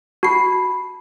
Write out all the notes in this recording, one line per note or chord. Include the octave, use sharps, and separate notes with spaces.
F#4 A5 B5 C7